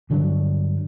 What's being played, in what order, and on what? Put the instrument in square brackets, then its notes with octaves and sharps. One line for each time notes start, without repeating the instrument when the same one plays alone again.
[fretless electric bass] G2 D3 F#3 D4